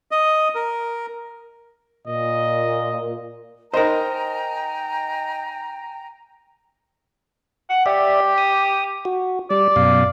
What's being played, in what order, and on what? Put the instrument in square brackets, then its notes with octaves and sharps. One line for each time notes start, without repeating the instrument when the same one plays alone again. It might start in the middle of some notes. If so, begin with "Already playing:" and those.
[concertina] D#5
A#4
[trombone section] A#2 [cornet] D#5
[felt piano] D#4 D#5 [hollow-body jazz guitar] A#4 C5 [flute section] G5 G#5 A#5
[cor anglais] F#5
[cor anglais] G4 [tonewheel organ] D5 E5
[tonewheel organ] D#6
F#4
[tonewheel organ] G3 [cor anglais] D5
[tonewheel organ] F#2 B2 F5